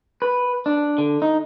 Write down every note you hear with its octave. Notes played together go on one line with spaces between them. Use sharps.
B4
D4
D3
D#4